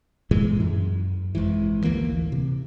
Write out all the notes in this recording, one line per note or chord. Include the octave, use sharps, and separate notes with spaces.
G2 A#2 E3 G#3
F#2
G#1 G#2 E3
A1 D2 E3 A#3
C3